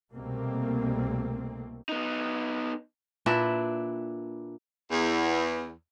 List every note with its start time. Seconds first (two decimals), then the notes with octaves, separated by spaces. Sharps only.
0.12 C2 B2 A3 A#3 C4
1.89 B3 D#4
3.26 A#2 D4 E4 B4
4.90 E2